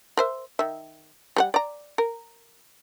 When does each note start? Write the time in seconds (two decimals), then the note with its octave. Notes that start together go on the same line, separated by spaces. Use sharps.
0.17 A#4 C5 E5
0.59 D#3 E5
1.36 G3 A#4 F#5
1.54 D5 A#5
1.98 A#4